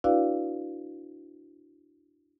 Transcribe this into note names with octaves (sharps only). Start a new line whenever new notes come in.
D4 E4 F#4 B4 D5 F5